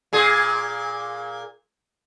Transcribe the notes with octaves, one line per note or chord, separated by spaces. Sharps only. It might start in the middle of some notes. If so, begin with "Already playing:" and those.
A#2 G#4